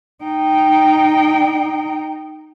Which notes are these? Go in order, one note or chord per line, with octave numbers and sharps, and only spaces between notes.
D#4 G5